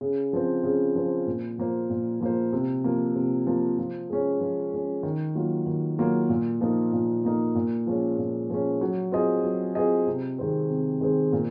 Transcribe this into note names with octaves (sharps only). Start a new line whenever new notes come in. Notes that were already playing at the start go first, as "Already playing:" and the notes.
C#3
F3 C4
C#3
F3 C4
A#2
F3 A#3 F4 C5
A#2
F3 A#3 F4 C5
C3
F3 A#3
C3
F3 A#3
F3
G#3 C#4
F3
G#3 C#4
D#3
F#3 A#3 F4
D#3
F#3 A#3 F4
A#2
F3 A#3 D#4 A#4
A#2
F3 A#3 D#4 A#4
A#2
F3 G#3 C#4
A#2
F3 G#3 C#4
F#3
C4 F4 G#4 D#5
F#3
C4 F4 G#4 D#5
C3
D#3 G#3 C4
C3
D#3 G#3 C4
A#2